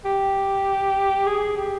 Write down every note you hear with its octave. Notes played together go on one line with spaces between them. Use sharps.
G4
G#4
G4